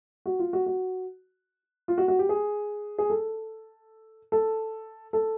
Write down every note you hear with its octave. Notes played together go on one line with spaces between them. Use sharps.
F#4
F4
F#4
F#4
F4
F#4
F#4
G4
G#4
G#4
A4
A4
A4